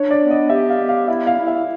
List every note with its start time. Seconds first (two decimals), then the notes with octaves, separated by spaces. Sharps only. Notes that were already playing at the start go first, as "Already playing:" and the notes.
Already playing: D4 C#5
0.11 D5
0.21 B3
0.30 D#5
0.49 G4 E5
0.70 F5
0.79 B3
0.89 F5
1.08 E4 E5
1.27 F5
1.37 E4
1.47 E5